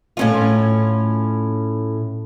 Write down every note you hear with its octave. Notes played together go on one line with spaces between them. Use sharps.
A2 C#4 F4